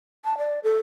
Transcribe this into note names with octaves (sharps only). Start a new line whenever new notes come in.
A5
D5
A4